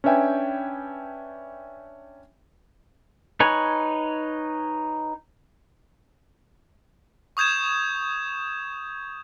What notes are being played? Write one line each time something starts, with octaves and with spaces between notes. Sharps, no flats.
C#4 D4 B4 E5 G5 G#5
D#4 B4 C#5 G#5
C#6 D#6 G6 G#6 E7